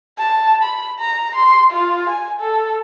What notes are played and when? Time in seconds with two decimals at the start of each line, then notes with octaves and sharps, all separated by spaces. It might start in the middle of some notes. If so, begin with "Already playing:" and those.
0.18 A5
0.63 B5
0.99 A#5
1.35 C6
1.71 F4
2.09 G#5
2.41 A4